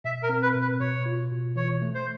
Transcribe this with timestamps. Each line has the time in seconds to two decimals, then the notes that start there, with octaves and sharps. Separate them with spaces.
0.04 B2 E5
0.23 A#4
0.29 C4
0.42 B4
0.55 B2
0.61 B4
0.80 B2 C#5
1.06 F4
1.31 B2
1.56 E3 C#5
1.82 A3
1.95 C5